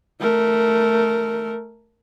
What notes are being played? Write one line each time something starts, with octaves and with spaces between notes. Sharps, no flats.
A3 A#4